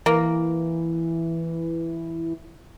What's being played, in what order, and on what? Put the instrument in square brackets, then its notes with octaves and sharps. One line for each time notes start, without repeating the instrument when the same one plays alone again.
[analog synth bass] E3 [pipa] A#3